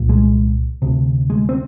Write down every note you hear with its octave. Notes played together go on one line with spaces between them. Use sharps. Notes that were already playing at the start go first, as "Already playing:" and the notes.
Already playing: C2 A#2
G#3
D2 C3
G#3
C4